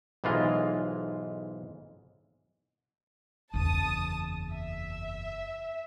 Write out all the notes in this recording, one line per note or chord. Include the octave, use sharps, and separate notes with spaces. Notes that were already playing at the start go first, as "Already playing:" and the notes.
B1 G#2 E3 G#3 F4
F#1 E2 A5 D#6
E5